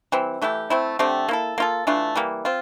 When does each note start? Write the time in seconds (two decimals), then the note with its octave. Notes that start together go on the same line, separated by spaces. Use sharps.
0.12 E3 G3 C4
0.42 E3 A3 E4 G4
0.70 A3 C4 E4
0.99 D3 A3 C4 G4
1.29 A#3 E4 A4
1.58 A#3 F4 A4
1.87 E3 A3 D4 F4
2.15 E3 G3 A#3
2.45 C4 F4